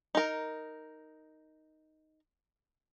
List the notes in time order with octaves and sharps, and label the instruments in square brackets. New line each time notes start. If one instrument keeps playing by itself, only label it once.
[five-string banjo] D#4 A#4